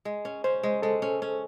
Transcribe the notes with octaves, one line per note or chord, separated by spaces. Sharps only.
G#3
C#4
C#4 C5
G#3
G#3 A4
C#4
C#4